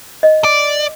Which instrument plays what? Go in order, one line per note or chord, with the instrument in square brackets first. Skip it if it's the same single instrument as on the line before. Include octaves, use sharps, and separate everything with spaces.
[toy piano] D#5
[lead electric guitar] D5